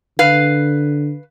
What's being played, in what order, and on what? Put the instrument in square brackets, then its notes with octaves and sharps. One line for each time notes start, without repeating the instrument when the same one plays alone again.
[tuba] D3 [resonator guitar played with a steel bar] B4 F5